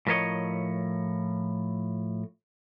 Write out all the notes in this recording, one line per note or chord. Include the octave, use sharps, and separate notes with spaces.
A2 F3 A#4 B4 C#5 D#5